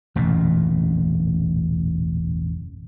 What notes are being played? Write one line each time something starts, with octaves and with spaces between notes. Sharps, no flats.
E1 A1 F#2 A#2